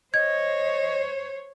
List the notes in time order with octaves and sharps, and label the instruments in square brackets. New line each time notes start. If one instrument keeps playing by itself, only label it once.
[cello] C5 C#5 [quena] D#5 [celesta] G#6